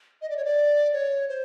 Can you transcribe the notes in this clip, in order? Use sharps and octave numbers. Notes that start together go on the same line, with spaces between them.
D#5
D5
C#5
D5
C#5
C5